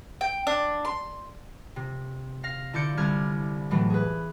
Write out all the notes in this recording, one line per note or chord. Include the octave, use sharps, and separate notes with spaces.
G5
D4
C6
C3
F5 A#6 C7
D3 E4 D5 G6 C#7
C2 D3 E4 F6 G#6
A2 E3 F#3 A3
G#4 B4